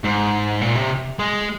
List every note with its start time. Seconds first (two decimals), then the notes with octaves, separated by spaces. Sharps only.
0.04 G#2
0.61 A#2
0.75 C3
1.19 G#3